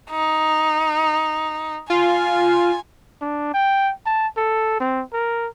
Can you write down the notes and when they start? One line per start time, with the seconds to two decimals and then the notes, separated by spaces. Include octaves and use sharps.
0.10 D#4
1.90 F4 G#5
3.22 D4
3.54 G5
4.06 A5
4.37 A4
4.80 C4
5.13 A#4